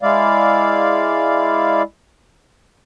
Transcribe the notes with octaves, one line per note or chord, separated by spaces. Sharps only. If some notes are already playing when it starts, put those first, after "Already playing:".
G#3 E4 D5 F5